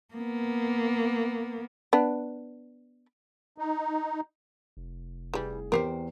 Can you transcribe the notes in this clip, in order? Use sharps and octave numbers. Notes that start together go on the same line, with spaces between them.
A#3 B3
B3 D4
D#4
F1
C2 E3 G3 G#4
E2 C4 G4 A#4 C7